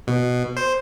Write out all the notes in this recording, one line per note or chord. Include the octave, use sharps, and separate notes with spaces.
B2
C5